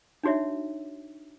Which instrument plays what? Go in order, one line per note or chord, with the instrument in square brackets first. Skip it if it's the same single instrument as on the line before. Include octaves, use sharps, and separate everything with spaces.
[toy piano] D4 D#4 F#4 C#5 E5